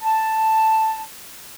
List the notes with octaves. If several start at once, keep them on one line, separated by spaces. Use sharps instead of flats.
A5